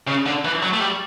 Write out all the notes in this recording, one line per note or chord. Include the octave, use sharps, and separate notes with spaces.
C#3
D3
E3
F#3
A3
G3